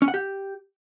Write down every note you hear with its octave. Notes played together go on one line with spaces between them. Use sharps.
C#4
F#5
G4